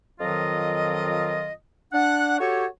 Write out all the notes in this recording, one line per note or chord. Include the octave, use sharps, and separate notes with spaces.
F2 D#3 F#3 F4 D#5
D4 F#5
F#4 G4 A4 C#5